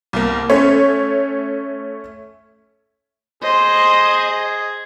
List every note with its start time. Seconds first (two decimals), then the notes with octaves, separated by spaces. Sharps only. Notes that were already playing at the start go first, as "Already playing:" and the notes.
0.13 C2 A#3
0.50 A3 C#4 C#5
3.43 G#4 C5 D#5